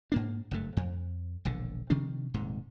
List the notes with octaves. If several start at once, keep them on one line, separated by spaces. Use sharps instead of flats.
G#2 A#3 D4
F#1 G2 A3
F2
E1 A#1 D3
C3 D#3 F3 D4
D#1 G#2 C3